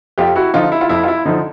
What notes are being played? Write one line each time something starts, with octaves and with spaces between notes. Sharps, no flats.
F2 F4 G4
E4 F#4
D3 F3 D#4 F4
E4
F4
F2 E4
F4
E4
D3 F3 D#4